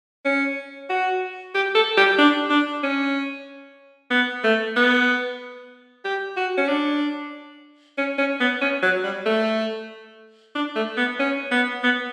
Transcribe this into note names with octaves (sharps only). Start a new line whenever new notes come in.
C#4
F#4
G4
A4
G4
D4
D4
C#4
B3
A3
B3
G4
F#4
C#4
D4
C#4
C#4
B3
C#4
F#3
G3
A3
D4
A3
B3
C#4
B3
B3